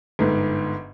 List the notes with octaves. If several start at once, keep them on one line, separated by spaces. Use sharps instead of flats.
G1 G#2